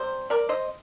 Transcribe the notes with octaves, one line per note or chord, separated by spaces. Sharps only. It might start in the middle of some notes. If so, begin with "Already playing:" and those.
Already playing: C3 G3 C5
A#4 D5
C5 D#5